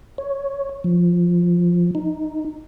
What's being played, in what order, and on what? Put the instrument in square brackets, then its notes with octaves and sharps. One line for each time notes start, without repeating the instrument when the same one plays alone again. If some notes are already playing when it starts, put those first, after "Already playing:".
[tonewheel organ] C#5
F3
D#4